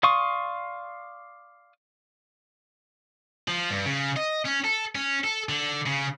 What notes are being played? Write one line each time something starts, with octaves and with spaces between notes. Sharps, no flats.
D5 F5 C6 C#6 D#6
F3
G2
C#3
D#5
C#4
A4
C#4
A4
D3
C#3